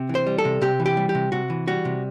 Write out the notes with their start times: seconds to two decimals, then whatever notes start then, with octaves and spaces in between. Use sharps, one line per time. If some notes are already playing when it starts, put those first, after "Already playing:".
Already playing: C3
0.09 E3
0.15 C5
0.27 G3
0.38 A4
0.45 C3
0.61 C3 G4
0.80 E3
0.86 G4
0.97 G3
1.09 G4
1.15 C3
1.32 C3 F#4
1.50 E3
1.68 G3 F#4
1.85 C3